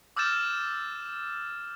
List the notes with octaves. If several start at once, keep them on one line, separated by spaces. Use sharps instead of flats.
D6 E6 F6 G6 A6 E7